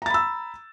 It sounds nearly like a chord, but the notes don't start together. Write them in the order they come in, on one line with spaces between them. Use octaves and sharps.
A#5 A6 B5 E6